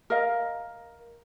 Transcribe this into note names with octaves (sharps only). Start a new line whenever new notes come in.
A#4 D#5 F5